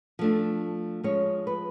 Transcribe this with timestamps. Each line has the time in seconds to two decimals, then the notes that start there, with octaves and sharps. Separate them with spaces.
0.19 F3 A3 D4
1.04 F3 G#3 C#4 C#5
1.47 B4